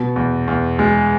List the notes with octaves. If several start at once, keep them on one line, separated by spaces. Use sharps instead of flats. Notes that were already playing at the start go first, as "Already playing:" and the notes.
Already playing: B2
E2
E2
G#3